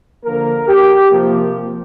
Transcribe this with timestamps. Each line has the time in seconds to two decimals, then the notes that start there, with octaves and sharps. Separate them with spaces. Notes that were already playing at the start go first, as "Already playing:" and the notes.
0.24 D3 F3 A#3 A#4
0.68 G4
1.12 C3 F3 A#3